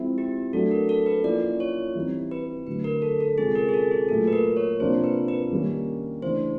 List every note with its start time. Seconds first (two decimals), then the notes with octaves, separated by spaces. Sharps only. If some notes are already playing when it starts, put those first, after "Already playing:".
Already playing: F3 G#3 C4 E4
0.18 G4
0.53 F#3 A3 D4 A4
0.71 A#4
0.89 A4
1.06 B4
1.24 F3 A#3 C#4 E4 D5
1.60 C#5
1.95 E3 G3 C4 D#4
2.31 B4
2.67 D3 F#3 A3 B4
2.84 A#4
3.02 A4
3.20 A4
3.38 C3 F3 G#3 C#4 G#4
3.55 A#4
3.69 G#4
3.74 A4
3.91 G#4
4.09 A#2 F#3 A3 A4
4.27 B4
4.33 A#4
4.57 C#5
4.80 C3 F3 A#3 D4 C5
5.04 B4
5.28 B4
5.52 D#3 G3 A#3 C#4
6.22 C#3 E3 A3 D4 C5